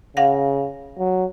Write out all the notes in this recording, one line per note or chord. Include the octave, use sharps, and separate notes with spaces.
C#3 F5 F#5 A#6
F#3